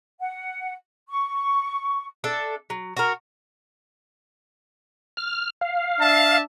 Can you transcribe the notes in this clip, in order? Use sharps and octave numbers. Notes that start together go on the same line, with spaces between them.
F#5
C#6
D4 A4 E5
F#3
F#4 A#4
F6
F5
D4 E5 A5